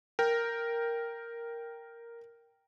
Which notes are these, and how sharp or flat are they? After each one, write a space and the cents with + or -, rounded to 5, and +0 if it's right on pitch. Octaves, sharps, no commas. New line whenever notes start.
A#4 +0 G5 +0